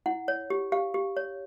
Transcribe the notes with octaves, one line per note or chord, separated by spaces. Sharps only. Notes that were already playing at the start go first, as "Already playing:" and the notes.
E4 F#5
C#5
G4
G4 F5
G4
C#5